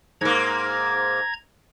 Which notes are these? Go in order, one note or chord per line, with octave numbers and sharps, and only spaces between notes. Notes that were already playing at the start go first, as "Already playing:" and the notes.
G#2 A#3 A#5 G#6